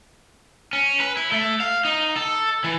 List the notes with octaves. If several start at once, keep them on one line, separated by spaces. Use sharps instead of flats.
C#4
B4
E4
A3
F5
D#4
A4
E3